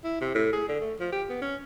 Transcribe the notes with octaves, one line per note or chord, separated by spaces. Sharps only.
E4
C3
A2
G#4
D3
A3
F3
G4
B3
C#4